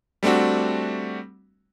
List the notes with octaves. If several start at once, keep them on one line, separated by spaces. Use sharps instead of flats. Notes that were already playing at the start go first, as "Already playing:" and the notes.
G3 A3 C4 D4 F#4